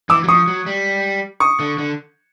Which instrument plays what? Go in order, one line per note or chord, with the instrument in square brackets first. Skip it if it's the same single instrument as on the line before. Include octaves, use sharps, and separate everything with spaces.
[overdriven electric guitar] E3 [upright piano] D6 E6
[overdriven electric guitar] F#3
[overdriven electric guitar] F3 [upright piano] C#6 D#6
[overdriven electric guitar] F#3
G3
[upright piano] C#6 D#6
[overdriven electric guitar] D3
D3